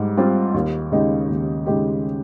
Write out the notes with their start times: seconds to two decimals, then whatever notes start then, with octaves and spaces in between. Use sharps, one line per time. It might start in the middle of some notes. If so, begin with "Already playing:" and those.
Already playing: G#2 G3
0.17 G3 C4 F4
0.54 D#2
0.92 C#3 G#3 D#4 G4
1.29 D#2
1.66 C#3 G#3 D#4 G4